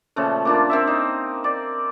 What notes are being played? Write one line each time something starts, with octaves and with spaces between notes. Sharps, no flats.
A#2 C#3 F3 A3
A#3 D4 F4
C4 A#4 E5
D#4
D5